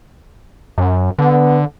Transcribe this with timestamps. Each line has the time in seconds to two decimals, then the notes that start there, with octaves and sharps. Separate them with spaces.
0.78 F#2
1.19 D3 B3